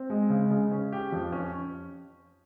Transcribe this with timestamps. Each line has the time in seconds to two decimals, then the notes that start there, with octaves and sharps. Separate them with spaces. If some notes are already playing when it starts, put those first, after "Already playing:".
Already playing: C4
0.10 G#3
0.30 C#3
0.50 C#3
0.71 C#4
0.92 G4
1.12 F2
1.32 C#4